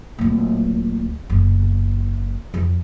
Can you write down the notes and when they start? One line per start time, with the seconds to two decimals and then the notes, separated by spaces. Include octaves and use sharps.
0.19 D1 A#2
1.30 F#1 B3
2.54 F2